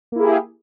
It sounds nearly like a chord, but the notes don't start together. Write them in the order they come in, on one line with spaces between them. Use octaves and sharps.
A#3 E4 G#4 G4